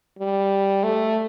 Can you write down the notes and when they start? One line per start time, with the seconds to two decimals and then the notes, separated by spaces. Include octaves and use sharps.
0.19 G3
0.84 A3